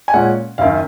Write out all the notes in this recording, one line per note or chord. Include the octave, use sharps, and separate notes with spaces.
G#5
A#2 G#3 C#4 F#5
F#1 F#2 D#3 F5